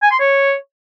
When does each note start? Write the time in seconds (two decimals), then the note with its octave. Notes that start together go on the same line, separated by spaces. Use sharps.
0.03 G#5
0.11 C6
0.20 C#5